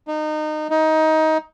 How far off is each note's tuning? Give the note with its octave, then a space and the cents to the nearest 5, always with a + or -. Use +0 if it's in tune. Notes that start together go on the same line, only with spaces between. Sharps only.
D#4 -25
D#4 +20